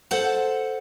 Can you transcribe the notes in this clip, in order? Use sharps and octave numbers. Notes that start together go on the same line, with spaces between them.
A4 C5 F#5 A5